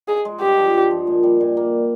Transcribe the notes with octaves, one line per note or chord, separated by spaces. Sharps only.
D#4 G#4
G#3
G2 G4
F3
G2
F3
A#2
G3
A#2
A#3